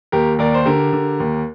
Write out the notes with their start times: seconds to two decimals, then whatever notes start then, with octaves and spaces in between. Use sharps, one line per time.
0.12 D#2 G4 A#4
0.39 D#2 A#4 D5
0.54 C5
0.65 D3 G4 A#4
0.93 D3
1.20 D#2